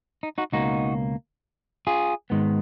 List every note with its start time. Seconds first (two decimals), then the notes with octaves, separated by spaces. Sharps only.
0.23 D#4
0.38 D#4 F#4
0.52 C#2 B2 A#3 D#4 F#4
1.87 F4 G#4
2.30 G#2 D#3 G#3 B3